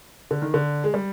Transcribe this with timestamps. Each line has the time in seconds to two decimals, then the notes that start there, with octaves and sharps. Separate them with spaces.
0.31 D3
0.42 D#3
0.54 D3
0.84 G#3
0.94 G3